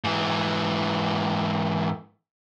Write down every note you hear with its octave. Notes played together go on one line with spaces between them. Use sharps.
G#2 E3